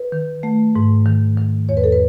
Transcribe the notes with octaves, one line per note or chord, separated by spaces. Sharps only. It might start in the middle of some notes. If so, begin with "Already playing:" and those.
Already playing: B4
D#3
A3
G#2
D#3
D#3
E2 C#5
B4
A4
B4